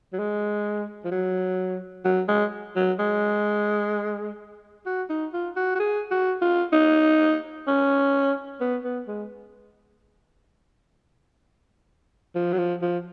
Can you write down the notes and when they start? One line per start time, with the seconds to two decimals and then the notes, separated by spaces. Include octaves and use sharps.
0.13 F#3
0.19 G#3
1.05 F3
1.12 F#3
2.05 F#3
2.28 G#3
2.76 F#3
2.99 G#3
4.86 F#4
5.10 D#4
5.34 F4
5.56 F#4
5.75 F#4
5.80 G#4
6.11 F#4
6.42 F4
6.73 D#4
7.68 C#4
8.61 B3
8.84 B3
9.08 G#3
12.35 F3
12.53 F#3
12.58 F3
12.82 F3